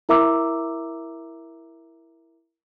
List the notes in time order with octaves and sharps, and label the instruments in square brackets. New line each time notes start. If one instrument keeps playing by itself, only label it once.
[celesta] E4 A#4 E5 A#5 D6 E6